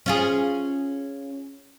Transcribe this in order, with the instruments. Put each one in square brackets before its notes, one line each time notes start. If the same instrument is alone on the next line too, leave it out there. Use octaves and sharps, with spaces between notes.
[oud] C#4 F4 G#4